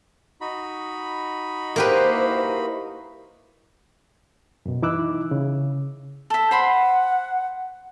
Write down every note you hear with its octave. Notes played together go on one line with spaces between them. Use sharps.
D#4 F#4 B5
A#3 E4 G4 B4 C5
F#2 B2
E3 D#4 E4 D6 E6 F#6
C#3
A4 E5
C5 F#5 B5 C6